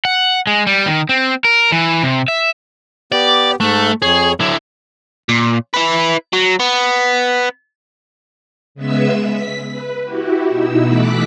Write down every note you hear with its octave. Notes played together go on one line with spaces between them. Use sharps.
F#5
G#3
G3
D#3
C4
A#4
E3
C3
E5
B3 G4 D5
G#2 A3 F#6
F2 G#4 C#5
D3 F#3 E4
A#2
E4 B4
F#3
B3
C#3 G#3 B3 B4 E5 E6
B6
B4
E4 F#4 G4
B2 D#4 E4 E6
B2 E3 A3 D6 F#6 B6